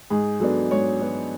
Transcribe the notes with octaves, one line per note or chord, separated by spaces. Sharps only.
G#2 G#4
F#3 B3 D4 A4
G#2 C#5
F#3 B3 D4